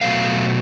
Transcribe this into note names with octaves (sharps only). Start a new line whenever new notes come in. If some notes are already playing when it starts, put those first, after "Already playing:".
B2 F#3 A3 F5